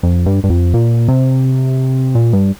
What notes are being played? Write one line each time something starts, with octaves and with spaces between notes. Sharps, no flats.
F2
G2
G2
F2
A#2
C3
A#2
G2